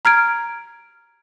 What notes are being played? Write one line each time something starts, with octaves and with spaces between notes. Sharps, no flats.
A#5 F6 G#6 D7